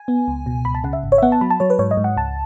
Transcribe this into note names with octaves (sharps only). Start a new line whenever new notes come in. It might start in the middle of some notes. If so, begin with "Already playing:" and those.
Already playing: G#5
B3
C#2
B2
C#2 B5
A5
C#3 F#5
E5
G#1
C#5
E5
B3 F#5
A5
F#3 B5
A5
F#3 C#5
B4
G#2 C#5
D#5
G#2
F#5
C#2 A5